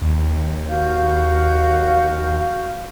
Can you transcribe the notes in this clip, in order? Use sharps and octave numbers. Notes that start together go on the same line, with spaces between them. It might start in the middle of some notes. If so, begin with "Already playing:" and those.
D#2
F#4 F5 G6